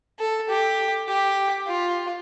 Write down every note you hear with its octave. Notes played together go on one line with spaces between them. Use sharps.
A4
G4
G4
F4